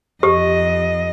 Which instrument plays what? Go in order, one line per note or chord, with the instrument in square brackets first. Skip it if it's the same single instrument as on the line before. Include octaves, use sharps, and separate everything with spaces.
[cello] F2 D#5 [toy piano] G4